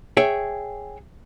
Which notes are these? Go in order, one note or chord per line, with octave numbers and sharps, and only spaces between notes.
G#4 C#5 E5 G5